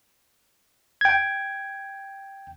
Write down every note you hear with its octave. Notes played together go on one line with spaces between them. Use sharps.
G5 G#6